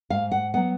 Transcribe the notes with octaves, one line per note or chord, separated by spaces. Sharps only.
G#2 F5
F#5
F#3 B3 F#5